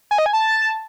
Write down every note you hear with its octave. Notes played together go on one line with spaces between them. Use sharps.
G#5
D#5
G#5
A5